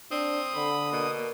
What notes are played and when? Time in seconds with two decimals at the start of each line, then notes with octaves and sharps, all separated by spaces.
0.11 C4 D4 D#6
0.55 D3 B5
0.92 B2 A#3